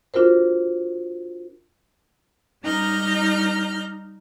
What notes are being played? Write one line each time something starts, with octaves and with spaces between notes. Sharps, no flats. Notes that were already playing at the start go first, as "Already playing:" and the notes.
D4 F4 F#4 A#4 C5
G3 D#4 A#5 F6 G6